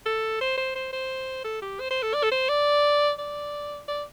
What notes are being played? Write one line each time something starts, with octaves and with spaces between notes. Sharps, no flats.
A4
C5
C5
C5
C5
A4
G4
C5
C5
A4
D5
A4
C5
D5
D5
D5